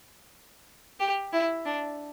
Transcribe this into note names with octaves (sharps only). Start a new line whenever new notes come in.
G4
E4
D4